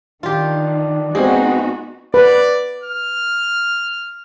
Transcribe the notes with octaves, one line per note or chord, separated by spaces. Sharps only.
D#3 D4 F4 G4
G#3 B3 C4 D#4 F#4 G#4
B4 D5
F6